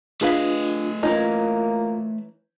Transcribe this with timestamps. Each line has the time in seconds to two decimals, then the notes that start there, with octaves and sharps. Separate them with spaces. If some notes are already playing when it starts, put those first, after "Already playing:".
0.21 A3 D4 F4 G#4 B4 D#5 F5
1.03 E3 A#3 C#4 D#4 F4